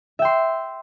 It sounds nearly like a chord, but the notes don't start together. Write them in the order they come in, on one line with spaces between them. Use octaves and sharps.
E5 G5 C6